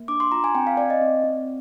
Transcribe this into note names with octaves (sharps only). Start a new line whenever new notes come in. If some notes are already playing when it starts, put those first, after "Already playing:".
Already playing: A#3
D4 D6
C6
F4 A#5
G#5
C4 G5
F5
C4 D5
D#5
C4
C4